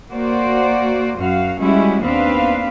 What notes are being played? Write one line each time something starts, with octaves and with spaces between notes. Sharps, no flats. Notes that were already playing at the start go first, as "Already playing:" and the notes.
A#3 F#4 C5 D5
F#2 F#4 F5
G3 G#3 C#4 E4 F#4
D#2 B3 C4 D4 B4 F5